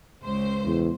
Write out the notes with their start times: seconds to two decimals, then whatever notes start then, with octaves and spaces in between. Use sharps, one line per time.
0.23 C#2 C5
0.65 E2